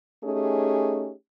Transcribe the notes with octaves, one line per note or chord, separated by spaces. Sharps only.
A3 C#4 D#4 G4 G#4